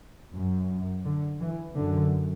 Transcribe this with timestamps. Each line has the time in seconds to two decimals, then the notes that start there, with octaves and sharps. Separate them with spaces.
0.31 F#2
1.04 D3
1.40 E3
1.76 F#2 D3